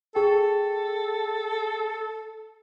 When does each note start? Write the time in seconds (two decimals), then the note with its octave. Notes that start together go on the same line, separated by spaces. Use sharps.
0.15 G#4 A4 G5